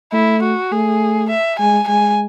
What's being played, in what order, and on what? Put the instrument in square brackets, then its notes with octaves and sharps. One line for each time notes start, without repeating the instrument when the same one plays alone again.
[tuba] A3 [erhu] E4
[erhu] F#4
[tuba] A3 [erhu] G#4
[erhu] E5
[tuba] G#3 [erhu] G#5
[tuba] G#3 [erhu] G#5